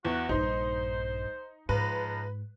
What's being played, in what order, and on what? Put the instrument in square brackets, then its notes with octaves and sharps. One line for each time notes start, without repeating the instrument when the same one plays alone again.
[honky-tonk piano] E2 [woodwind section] F#4
[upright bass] A#1 G2 [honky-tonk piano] D#4 [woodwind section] C5
[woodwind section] C#2 F3 A#5 [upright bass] G#2 [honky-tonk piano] B4